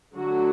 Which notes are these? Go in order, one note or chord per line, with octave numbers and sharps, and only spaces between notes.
D3 F#3 A3 F#4